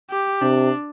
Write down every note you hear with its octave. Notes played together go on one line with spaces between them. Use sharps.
G4
C3 D4